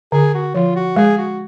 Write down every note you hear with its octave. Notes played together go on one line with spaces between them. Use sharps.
D3 G#4
F#4
F3 F4
F#4
G#3 G#4
F#4